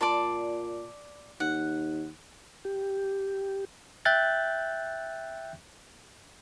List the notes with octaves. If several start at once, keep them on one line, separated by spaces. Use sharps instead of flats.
A#2 D5 A5 C6
D#2 F#5
G4
E5 G5 F#6 G6 A6